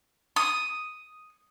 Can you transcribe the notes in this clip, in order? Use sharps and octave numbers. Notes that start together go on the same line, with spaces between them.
D#6